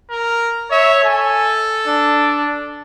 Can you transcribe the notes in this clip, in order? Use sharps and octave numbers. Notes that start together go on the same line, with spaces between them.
A#4
C#5 E5
A4 G#5
D4